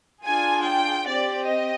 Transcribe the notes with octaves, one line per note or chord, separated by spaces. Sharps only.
D4 F4 G#4 G#5
G5
C4 G4 D5
D#5